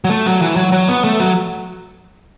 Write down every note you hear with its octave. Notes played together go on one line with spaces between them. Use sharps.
F#3
A3
F#3
E3
F#3
F#3
B3
A3
F#3